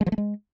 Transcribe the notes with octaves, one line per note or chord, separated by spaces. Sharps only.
G#3
F3
A3
G#3